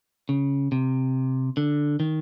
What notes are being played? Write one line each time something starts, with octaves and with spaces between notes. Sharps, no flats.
C#3
C3
D3
D#3